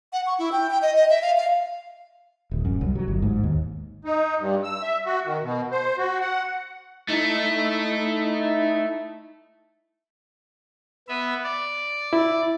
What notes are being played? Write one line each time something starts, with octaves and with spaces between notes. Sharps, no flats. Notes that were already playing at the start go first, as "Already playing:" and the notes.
F#5
C#6
E4
G5
G5
D#5
D#5
E5
F5
F5
D1
F#2
C2
F#3
G1
G#2
D#2
D#4
G2
E6
E5
F#4
D#3
B2
C5
F#4
F#5
A3 D#4 E4
B3 B4 E5
D5
E4